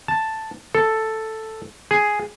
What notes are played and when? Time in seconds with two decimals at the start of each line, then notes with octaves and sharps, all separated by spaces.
0.08 A5
0.75 A4
1.91 G#4